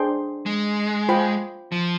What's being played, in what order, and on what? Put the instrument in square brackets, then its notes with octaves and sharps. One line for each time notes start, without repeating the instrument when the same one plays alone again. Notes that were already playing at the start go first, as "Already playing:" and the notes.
Already playing: [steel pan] D4 G#4 C5 G5 C6
[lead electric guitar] G#3
[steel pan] F4 C5 G5 B5
[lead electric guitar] F3